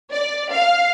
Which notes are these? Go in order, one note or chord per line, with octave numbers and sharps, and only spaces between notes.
D5
F5